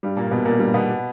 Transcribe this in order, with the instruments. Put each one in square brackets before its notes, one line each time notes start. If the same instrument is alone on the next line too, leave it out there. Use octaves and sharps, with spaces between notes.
[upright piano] G2 G3
A#2 A#3
A#3
B2 B3
A#2 A#3
G2 G3
B2 B3